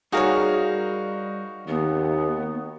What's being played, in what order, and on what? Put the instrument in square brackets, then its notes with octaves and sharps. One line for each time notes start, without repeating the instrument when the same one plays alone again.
[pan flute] G3 [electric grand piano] D#4 F#4 F5 [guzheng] G#4 A#4 C#5
[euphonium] D#2 [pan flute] B3